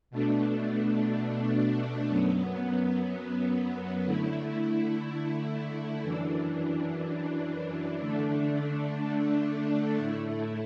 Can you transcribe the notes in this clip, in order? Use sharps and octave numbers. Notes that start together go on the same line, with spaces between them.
B2 A3 D4
F#2 F#3 B3
D3 A3 E4
F#2 E3 D4
D3 A3 D4
A2 A3 E4